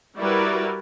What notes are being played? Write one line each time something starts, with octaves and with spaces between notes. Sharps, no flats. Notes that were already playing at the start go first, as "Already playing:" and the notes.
G3 E4 F#4 A#4 B4 D5